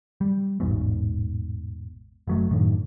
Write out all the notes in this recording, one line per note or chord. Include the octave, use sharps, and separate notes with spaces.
G3
A1 E2 G#2 B2
F#1 F#3 A3
F#2 A2 D3 D#3